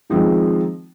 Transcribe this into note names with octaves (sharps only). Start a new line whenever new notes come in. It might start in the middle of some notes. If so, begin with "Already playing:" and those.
D#3 F3 G#3 C4 D#4